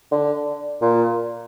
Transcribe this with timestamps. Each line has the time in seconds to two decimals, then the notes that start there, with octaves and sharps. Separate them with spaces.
0.11 D3
0.81 A#2